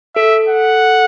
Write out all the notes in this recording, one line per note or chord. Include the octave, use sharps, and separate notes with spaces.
A4 E5
F#5